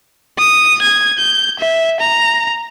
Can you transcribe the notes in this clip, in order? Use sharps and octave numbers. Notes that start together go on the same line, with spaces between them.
D#6
G#6
G6
E5
A#5